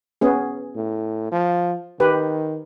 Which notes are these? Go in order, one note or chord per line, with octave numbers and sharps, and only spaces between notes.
B3 C#4 G#4
A2
F3
D#3 G4 B4